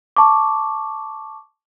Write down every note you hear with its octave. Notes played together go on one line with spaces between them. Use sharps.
A5 C#6 D6